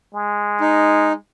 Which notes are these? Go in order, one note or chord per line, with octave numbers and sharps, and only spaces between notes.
G#3
D#4